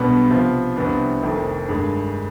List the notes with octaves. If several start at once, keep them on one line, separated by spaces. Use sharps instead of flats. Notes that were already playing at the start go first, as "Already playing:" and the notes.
Already playing: B1 B2 G3 B3 D4
C3 F3 B3 F4
C2 C3 F3 B3 D4
F1 F2 C3 D#3
G2 D#3 G#3 D4 G#4